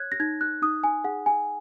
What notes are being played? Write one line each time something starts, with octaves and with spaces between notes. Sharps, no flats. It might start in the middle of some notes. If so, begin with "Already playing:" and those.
Already playing: C#5 F#6 G#6
A#6
D#4 G#6
F#6
D#4 D#6
G#5
G#4 F#5
G#5